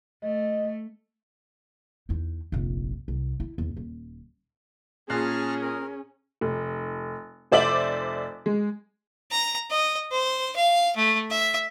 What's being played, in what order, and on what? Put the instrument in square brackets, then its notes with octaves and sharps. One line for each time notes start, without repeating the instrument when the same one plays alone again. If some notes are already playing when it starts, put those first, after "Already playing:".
[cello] A3 [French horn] D#5
[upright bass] E2 D#4
F1 A#1
C2
E4
E2
D#1
[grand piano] A#2 F#6 C7 [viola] C#4 [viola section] G#4 [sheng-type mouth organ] A5 A#5 F6
[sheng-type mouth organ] A#4
[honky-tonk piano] F1
F1 C5 D5 E5 D6 F#7
G#3
[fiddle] A#5
D#5
C5
F5
A3
E5